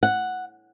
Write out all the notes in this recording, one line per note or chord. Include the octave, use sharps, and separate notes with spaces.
F#5